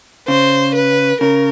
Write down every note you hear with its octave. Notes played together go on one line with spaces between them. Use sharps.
C#3 C5
B4
C#3 A#4